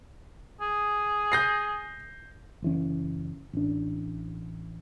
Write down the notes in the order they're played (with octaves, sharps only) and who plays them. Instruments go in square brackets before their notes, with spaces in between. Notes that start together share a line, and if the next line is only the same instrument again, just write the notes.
[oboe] G#4
[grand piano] G6 A#6 C7
[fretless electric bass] F#1 E3 C#4
A1 D4